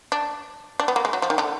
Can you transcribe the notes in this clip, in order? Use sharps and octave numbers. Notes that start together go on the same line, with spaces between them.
D4
D4
B3
A#3
G#3
F#3
F3
D#3
D3